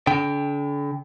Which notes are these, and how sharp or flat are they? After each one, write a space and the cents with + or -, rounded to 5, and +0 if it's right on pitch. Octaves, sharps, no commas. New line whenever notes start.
D3 -40 G5 +0